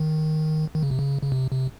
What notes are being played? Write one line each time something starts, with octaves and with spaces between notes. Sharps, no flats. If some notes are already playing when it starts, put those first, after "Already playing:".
Already playing: D#3
D#3
C#3
C3
C#3
C#3
C3
C3